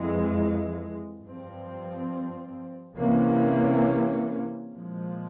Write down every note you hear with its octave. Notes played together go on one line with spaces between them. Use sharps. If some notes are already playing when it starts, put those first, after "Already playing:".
Already playing: F2 E3 G#3
G2 F3 C4
C2 C3 E3 A#3 C#4
A#2 F3 G#3